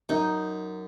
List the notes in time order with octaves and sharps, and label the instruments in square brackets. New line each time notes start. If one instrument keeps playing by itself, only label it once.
[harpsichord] F#2 [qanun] D#4